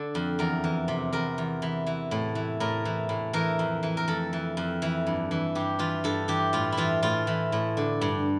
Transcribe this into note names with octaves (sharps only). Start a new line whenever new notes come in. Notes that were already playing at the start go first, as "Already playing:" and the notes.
Already playing: D3 A4
F2
E2 A#4
E3
C3
E2 A#4
E2
E3
E3
A2
E3
A2 A#4
E3
A2
E3 A#4
F2
E3
A#4
F2 A4
E3
F2
E3
G2
E3
G2 G4
E3 F4
G2 A4
E3 G4
A2 F4
E4
E3 F4
A2 F4
E3
A2
D3
G2